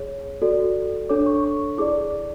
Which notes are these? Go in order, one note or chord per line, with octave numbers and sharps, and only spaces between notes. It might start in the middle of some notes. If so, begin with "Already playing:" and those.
Already playing: G#4 C#5
F#4 A4 D5
D4 A4 C#5 D6
C#6
C#6
E4 G#4 D5 D6